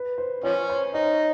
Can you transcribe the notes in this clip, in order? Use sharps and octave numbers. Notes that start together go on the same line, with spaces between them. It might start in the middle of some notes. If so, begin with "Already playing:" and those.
Already playing: B4
C5
F3 C#4 C#5
C5
D#4 C#5